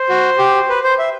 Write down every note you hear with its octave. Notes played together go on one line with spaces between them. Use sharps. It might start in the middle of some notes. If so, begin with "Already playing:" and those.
Already playing: C5
F#4
G4
B4
C5
E5